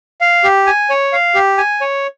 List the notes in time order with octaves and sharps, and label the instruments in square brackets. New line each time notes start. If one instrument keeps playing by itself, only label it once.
[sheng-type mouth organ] F5
G4
G#5
C#5
F5
G4
G#5
C#5